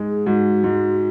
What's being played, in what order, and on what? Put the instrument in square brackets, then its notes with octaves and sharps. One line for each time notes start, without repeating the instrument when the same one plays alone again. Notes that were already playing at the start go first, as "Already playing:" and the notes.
Already playing: [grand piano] G#2 G#3
[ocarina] G#4
[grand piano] G#2 [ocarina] F#4
[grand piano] G#2